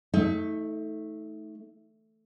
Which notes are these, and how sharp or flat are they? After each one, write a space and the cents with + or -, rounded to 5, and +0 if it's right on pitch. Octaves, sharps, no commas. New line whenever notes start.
A3 +0 D#4 +35